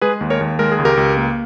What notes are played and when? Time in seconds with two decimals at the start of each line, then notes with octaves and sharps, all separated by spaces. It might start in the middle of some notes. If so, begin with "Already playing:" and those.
0.02 G#3 G#4 B4
0.21 D#2
0.30 A#4 C#5
0.41 D#2
0.59 G#3 A#4
0.72 G#4
0.78 C#2
0.85 G4 A#4
0.97 C#2
1.17 A#3